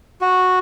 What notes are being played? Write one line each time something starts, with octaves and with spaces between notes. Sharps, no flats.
F#4